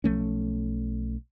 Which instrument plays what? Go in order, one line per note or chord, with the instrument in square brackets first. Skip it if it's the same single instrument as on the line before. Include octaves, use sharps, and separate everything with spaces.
[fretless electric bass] B1 F3 A3 C#4